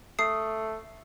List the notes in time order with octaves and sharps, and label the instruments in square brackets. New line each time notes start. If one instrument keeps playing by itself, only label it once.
[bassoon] A3 [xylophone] D#6 C7